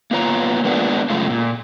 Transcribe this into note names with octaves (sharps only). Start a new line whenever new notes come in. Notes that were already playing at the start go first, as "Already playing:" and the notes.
A#3 B3 F4 C#5 A#5
G#3 A#3 B3 D4 E4 F4
F#2 C#3 G#3 A3 F4
A#2